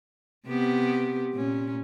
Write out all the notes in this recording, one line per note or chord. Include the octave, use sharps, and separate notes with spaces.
C3 B3 G4
A#2 C#4